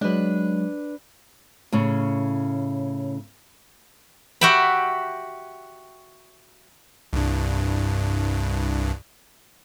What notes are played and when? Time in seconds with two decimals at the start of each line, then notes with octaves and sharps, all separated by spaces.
0.01 F#3 G#3 D4 B4
1.72 A2 C#3 C#4
4.41 F#4 G4 E5 G5 B5
7.13 C2 G2